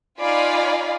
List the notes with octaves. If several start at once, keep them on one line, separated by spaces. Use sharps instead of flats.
D#4 F4 D5 F5 G#5 B5